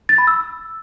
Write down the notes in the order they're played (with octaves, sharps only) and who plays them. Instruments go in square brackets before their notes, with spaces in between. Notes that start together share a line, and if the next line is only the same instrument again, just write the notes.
[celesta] A6
B5
E6